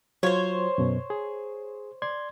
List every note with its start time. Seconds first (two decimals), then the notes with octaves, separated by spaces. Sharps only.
0.23 F#3 F4 F#4 C5 C#5
0.78 F#2 B2
1.10 G#4
2.02 D5 C6 G#6